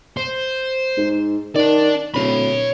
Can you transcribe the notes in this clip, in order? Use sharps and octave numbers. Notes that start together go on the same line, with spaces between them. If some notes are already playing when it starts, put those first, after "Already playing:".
C5
G#2
D#3 D4 D5
D1 C#5 B5